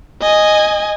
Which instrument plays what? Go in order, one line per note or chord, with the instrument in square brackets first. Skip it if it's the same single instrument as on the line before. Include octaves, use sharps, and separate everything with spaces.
[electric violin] D#5 G#5